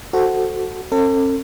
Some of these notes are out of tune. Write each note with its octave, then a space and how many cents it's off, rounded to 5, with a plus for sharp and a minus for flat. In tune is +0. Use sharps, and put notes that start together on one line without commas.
F#4 +0 A4 +0 C5 +0
C#4 -45 A4 +40